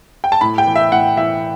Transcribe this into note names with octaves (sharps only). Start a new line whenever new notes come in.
G5
A5
A2 B5
G5
E3
E5
A2 F#5
E3 E5